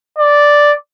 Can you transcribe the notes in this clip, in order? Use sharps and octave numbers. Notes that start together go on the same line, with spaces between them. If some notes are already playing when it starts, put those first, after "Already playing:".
D5